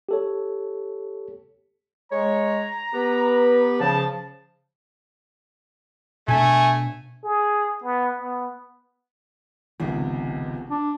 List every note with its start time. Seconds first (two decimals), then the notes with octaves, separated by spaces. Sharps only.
0.09 G4 A4 C#5
2.12 G#3 C#5 A#5
2.94 B3 G4 B4
3.80 C#3 F3 A5
6.28 B2 A3 D4 G#5
7.24 G#4
7.84 B3
8.19 B3
9.80 G#1 C#2 C3 F3 B3
10.70 D4